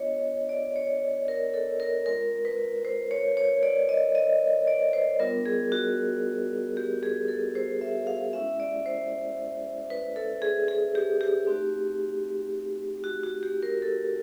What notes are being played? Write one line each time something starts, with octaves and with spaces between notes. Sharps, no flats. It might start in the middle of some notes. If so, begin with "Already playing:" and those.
Already playing: B3 D4 F4 C#5 D#5
D5
C#5
A#4
A4
A#4
G#3 C4 F4 A#4
B4
C5
C#5
C#5
D5
D#5
D#5
D5
C5
G3 B3 D4 F4 A#4
G#4
F#4
G4
G#4
A4
C5
E5
F5
G#3 C#4 E4 E5
D5
C5
B4
A4
G#4
G#4
G4
G4
A3 C4 D#4 F#4
F#4
F#4
G4
A#4
A4